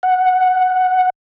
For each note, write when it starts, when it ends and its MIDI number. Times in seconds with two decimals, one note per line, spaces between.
0.03 1.10 78